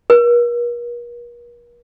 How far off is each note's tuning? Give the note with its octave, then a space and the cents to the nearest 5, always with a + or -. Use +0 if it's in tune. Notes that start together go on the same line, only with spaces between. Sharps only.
A#4 +45